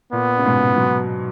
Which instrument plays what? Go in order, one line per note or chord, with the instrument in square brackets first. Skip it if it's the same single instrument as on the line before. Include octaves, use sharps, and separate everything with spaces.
[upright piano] A#2 [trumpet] B3
[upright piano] C#3
G#2 B2
F#3